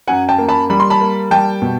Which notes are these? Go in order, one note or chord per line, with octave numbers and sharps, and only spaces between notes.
F#2 F#5 G#5
G5 A5
A#3
A5 B5
G3 B5
C6
A5 B5
A#3
G3 G5 A5
B2